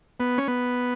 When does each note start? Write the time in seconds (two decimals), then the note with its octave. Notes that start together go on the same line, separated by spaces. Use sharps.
0.20 B3
0.38 C#4
0.48 B3